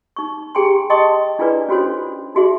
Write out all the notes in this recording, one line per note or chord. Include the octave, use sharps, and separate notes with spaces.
D#4 C#6
G4 G#4 G5 G#5 A#5 C6
D#5 G5 A5 C6 C#6 D#6
D4 E4 F4 G#4 B4 D5
C#4 F4 F#4 A4 C5 C#5
D#4 F4 F#4 G#4 E5 C6